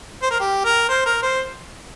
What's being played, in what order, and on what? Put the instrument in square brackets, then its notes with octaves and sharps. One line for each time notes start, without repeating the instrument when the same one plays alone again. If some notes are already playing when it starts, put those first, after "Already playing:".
[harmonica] C5
A#4
G4
A#4
C5
A#4
C5